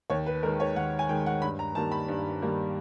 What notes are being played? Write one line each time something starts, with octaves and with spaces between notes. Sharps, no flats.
D#2 C#5
B4
D#3 G#3 A#4
C#5
D#2 F#5
G#5
D#3 G#3 G5
F#5
G2 B5
A#5
D#3 G3 A#3 A5
B5
G2
D#3 G3 A#3